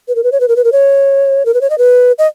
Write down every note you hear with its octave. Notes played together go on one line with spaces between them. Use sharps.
B4
A#4
B4
C#5
B4
A#4
B4
A#4
C#5
A#4
B4
C#5
D#5
B4
D#5